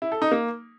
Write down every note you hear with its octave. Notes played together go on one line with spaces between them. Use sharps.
E4
A4
D#4
A#3